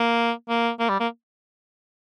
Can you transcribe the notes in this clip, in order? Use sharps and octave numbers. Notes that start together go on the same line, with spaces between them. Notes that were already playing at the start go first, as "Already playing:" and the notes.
Already playing: A#3
A#3
A#3
G3
A#3